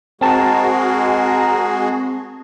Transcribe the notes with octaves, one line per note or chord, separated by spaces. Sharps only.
G#3 C4 F#4 G#4 A#4 A5